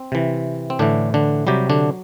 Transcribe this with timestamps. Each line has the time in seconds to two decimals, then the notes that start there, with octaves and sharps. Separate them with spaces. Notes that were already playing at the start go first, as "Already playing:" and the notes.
Already playing: C4
0.12 C3 E3
0.70 C4
0.79 A2 D3 E3 D4
1.14 D3 D4
1.47 C3 F#3 G3 G4
1.70 D3 D4